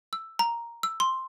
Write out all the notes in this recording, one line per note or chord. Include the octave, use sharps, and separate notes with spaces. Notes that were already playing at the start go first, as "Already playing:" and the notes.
E6
A#5
E6
C6